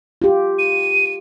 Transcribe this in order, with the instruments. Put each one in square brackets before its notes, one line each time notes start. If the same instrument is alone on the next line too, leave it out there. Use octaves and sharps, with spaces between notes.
[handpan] F4 G4
[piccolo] D#7